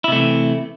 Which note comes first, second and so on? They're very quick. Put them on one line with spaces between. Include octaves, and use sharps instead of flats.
E4 C3 A3 E3